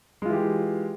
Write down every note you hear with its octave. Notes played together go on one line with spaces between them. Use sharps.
E3 G#3 F4 G4